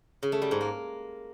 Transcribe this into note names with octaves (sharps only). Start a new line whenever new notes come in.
C#3
A3
G3
G#2
A#3